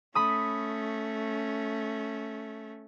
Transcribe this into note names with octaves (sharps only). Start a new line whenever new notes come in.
A3 C#4 B5 D#6